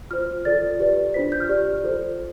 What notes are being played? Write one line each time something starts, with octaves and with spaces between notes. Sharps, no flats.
F4 C5 F6
F4 A4 D5 A6
G4 B4 D5
D4 F4 C5 B6
G6
F6
G4 D5
F4 A4 C5